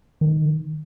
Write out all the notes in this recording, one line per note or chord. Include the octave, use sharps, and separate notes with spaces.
D#3